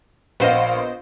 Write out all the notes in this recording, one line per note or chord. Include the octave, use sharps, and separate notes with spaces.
A#1 B3 C5 D#5 F5